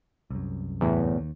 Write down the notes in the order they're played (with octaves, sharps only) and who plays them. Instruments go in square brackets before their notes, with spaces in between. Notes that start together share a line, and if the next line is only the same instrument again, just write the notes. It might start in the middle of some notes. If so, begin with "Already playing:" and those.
[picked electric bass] C2 F#2
[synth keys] E2 A2
[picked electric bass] D#2